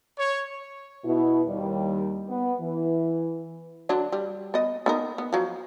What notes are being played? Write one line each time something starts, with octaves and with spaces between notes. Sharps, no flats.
C#5
B2 E4
D#2 G3
B3
E3
D3 F#3 D4
G3
B3 D#5
B3 D#4 A#4
B3
F3 F#3